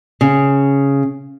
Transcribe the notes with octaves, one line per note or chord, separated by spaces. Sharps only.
C#3